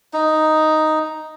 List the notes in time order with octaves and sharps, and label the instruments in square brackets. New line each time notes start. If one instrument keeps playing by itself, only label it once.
[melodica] D#4